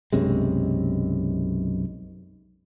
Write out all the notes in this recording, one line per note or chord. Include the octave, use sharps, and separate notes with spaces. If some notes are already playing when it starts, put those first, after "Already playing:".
B1 F#2 C3 G#3